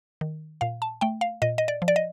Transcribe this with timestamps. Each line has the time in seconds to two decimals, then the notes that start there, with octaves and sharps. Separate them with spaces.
0.21 D#3
0.61 A#2 F5
0.82 A5
1.01 A3 G5
1.21 F5
1.42 A#2 D#5
1.58 D#5
1.68 D5
1.82 F3
1.88 D5
1.96 D#5